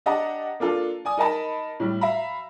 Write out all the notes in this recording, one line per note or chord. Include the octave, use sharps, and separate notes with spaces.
D4 G4 D#5 F#5 A5 A#5
A#3 D4 F4 A4
D5 G#5 D#6
D#4 A#4 D#5 A5 B5
A2 G3
E5 F5 A#5 B5